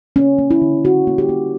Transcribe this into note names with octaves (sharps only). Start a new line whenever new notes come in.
A#3 C#4
A#3
E4
D3
D3 F#4
A#3
G4
A#3